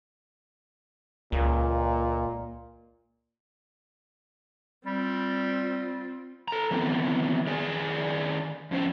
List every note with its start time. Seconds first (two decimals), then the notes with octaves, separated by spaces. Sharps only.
1.32 C#2 A#2
4.86 G3 C4 F4
6.48 A4 A#5
6.71 D#3 E3 B3 C4
7.47 D#3 G#4 D5 G#5
8.71 F2 C#4 C5